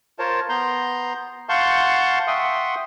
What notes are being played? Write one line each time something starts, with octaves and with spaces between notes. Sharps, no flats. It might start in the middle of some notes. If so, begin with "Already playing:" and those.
F4 A#4 C5 C#5 A5
B3 A#5 C6 G6
F5 F#5 A5 C6 C#6 G6
E5 F#5 G5 C6 C#6 D#6